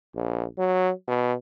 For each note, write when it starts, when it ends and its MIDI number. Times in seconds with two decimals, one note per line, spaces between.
0.15 0.46 34
0.58 0.92 54
1.08 1.34 47